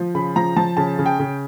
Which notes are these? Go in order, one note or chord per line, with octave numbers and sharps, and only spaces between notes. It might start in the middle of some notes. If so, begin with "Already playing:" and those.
Already playing: F3
C#3 B5
F3 A#5
F3 A5
C#3 A5
C#3
G5
C#3